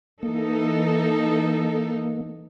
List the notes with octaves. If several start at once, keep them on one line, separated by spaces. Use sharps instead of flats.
E3 A#3 D#4 A4